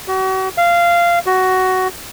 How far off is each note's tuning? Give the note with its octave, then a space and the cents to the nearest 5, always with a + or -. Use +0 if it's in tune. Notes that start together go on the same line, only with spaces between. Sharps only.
F#4 +40
F5 -15
F#4 +15